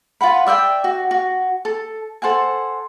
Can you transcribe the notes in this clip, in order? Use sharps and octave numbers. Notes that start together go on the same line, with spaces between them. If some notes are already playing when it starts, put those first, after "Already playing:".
F4 B4 F#5 B5
D5 E5 F#5 G5
F#4
F#4
A4
A4 C5 F#5 G#5